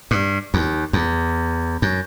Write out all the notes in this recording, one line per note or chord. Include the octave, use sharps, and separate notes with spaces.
G2
D#2
E2
F#2